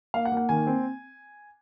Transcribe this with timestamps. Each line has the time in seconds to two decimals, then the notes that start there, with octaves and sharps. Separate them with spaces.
0.14 A#3 F5
0.25 F#5
0.32 A#3
0.37 F#5
0.49 D#3 G#5
0.67 C4